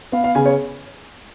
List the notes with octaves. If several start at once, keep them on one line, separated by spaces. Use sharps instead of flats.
B3 F5
F5
C#3 G#5
C#5